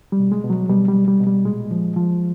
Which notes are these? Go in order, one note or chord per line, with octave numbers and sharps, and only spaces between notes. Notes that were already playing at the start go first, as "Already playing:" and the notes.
G3
B2
G#3
B2
F#3
B2 G3
G3
B2
G3
B2
G3
A#2 G#3
F3
F3